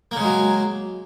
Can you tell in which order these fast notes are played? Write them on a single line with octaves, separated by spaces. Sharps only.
A#3 C#3 G#3 F#3